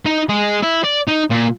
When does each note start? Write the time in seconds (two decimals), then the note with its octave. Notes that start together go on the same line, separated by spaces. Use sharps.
0.06 D#4
0.29 G#3 G#4
0.63 E4
0.84 D5
1.08 D#4
1.31 A#2